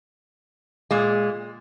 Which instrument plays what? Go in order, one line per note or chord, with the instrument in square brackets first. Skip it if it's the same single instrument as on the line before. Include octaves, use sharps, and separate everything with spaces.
[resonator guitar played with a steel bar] A#2 G#3